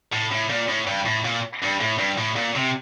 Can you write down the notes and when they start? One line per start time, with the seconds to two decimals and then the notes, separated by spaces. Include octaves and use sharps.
0.12 A2
0.32 A2
0.50 A#2
0.69 A2
0.87 G2
1.06 A2
1.25 A#2
1.62 G2
1.81 A2
1.99 G2
2.18 A2
2.36 A#2
2.56 C3